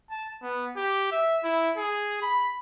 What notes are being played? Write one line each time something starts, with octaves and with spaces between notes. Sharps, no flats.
A5
B3
G4
E5
E4
G#4
B5